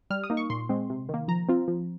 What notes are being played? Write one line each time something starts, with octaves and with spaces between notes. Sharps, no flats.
G3 F6
D#6
A#3 D#4
C#6
A#2 C6
G#3 C4
C3
D#3
A#3
F3 A#5
C4 F4
F3